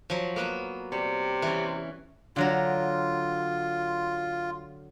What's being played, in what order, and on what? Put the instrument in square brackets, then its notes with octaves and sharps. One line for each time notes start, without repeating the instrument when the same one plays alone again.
[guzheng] F3 F#3
A#3 B3 B4
[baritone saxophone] C3 [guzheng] G3
[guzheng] E3 C#4
[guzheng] D3 F#3 A#4 [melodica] F4